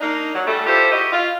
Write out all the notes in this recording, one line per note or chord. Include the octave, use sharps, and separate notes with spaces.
A#3 D4 D#4
F#3
C#3 G3 A3
E4 F4 G4 A4 C5
E4 F#4 G4 D#5
F4